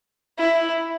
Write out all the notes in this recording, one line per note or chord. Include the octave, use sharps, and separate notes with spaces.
E4